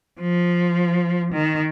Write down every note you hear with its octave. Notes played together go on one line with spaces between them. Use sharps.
F3
D#3